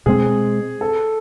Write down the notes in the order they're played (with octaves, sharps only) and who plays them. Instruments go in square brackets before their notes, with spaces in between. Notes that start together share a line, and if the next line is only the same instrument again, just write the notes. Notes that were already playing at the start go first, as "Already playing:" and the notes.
[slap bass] B2 G#3 C4 [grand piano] G#4
[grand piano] A4